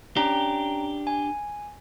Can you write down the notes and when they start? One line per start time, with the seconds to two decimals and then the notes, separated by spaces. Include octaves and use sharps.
0.17 C#4 D4 G4 G5 A#5
1.07 G#5